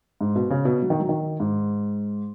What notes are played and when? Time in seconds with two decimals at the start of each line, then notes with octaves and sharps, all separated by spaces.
0.21 G#2
0.36 B2
0.50 C#3
0.65 B2
0.82 F#3
0.90 D#3
1.00 F#3
1.09 D#3
1.40 G#2